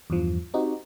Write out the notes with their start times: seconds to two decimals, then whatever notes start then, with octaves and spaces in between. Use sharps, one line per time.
0.10 E2 G2 F3
0.54 C4 D#4 F#4 G4